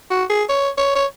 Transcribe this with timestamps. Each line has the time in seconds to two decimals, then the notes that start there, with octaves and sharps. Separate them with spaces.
0.10 F#4
0.30 G#4
0.49 C#5
0.78 C#5
0.95 C#5